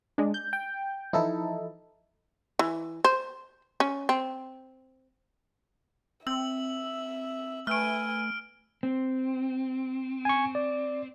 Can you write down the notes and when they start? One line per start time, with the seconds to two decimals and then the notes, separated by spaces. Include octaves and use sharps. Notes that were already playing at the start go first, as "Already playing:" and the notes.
0.18 G#3 D4
0.34 G6
0.53 G5
1.13 E3 F3 D#4 E4 A4
2.59 E3
3.04 C5
3.80 C#4
4.09 C4
6.27 C4 E5 E6 F#7
7.67 A3 B4 G#5 F6 D7
8.83 C4
10.25 G#5 C#6
10.55 D5